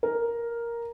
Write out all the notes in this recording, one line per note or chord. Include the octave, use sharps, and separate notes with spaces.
A#4